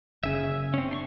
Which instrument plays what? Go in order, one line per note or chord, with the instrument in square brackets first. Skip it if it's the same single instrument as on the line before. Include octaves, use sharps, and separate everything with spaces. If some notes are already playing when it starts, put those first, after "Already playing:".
[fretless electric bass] F#1 C#3 [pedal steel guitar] E5 G#5
[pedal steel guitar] C4 C#4
D4 C6 C#6